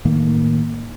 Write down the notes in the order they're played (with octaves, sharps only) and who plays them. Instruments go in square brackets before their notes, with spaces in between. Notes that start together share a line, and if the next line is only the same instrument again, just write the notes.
[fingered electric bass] A2 D#3 A#3